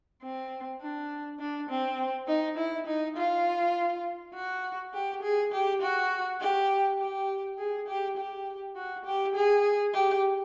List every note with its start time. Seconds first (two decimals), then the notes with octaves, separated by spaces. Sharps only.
0.22 C4
0.80 D4
1.39 D4
1.69 C4
2.27 D#4
2.58 E4
2.87 D#4
3.17 F4
4.34 F#4
4.93 G4
5.22 G#4
5.52 G4
5.82 F#4
6.40 G4
6.99 G4
7.58 G#4
7.87 G4
8.17 G4
8.76 F#4
9.05 G4
9.35 G#4
9.94 G4